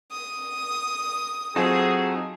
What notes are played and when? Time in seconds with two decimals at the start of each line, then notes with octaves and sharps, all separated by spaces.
0.12 D#6
1.56 F#3 C4 D#4 F4 F#4 G#4 A4